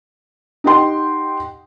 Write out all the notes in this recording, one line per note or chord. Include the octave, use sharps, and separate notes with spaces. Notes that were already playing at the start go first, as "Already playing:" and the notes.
D#4 G4 D#5 F#5 G5 C6